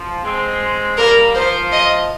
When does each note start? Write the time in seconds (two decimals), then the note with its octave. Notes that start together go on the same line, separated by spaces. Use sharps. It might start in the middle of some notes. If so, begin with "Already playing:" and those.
Already playing: F3
0.24 G#3 C4
0.98 G3 A#3 A#4
1.35 F3 C5
1.72 D#5